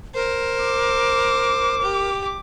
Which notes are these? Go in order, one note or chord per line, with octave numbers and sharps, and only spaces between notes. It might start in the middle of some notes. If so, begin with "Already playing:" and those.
A#4 C5
D6
G4